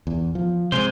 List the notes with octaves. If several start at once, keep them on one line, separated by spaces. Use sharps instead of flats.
E2
F3
C3 G#3 C5